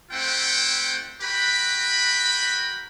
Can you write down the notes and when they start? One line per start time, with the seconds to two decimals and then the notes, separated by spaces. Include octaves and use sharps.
0.11 A3 C4 E4 C5 F#5 G5
1.21 F#4 A#4 B4 G5 B5